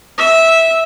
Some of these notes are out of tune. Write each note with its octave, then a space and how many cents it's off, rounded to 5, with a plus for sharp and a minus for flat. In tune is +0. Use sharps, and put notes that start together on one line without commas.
E5 -10